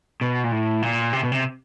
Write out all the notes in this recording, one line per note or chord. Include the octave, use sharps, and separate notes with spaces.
B2
A#2
A2
A#2
C3
B2
C3